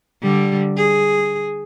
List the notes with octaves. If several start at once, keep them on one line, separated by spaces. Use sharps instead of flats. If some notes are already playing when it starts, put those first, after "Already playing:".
D3 G3
G#4